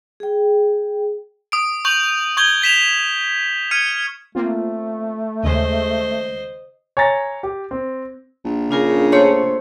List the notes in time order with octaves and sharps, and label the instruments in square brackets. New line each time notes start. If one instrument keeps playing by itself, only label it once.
[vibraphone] G#4 G5
[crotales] D#6 D7
C#6 G6 F7 F#7
C#6 G6 G#6 G7
G#6 B6 E7 F7
F6 G#6 C#7 D#7
[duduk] A3 [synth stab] A#3 C4 F4
[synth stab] D#2 C#3 G#3 [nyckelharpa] C5 D#5
[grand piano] C#5 G#5 A#5 A6 A#6
G4
C4
[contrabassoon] A#1
[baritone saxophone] C#3 [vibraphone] D4 F4 A#4
[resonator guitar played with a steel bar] A3 C#5 [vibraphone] C5 C6